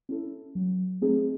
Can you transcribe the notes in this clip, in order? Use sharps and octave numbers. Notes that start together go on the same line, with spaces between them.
C#4 E4 A4
F#3
A3 C4 D#4 G#4